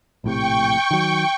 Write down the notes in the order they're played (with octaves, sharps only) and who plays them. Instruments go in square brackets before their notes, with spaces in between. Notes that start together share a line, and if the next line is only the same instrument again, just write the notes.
[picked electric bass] A#1 A2 C3 [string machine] G5 C#6
[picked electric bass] D#3 F#3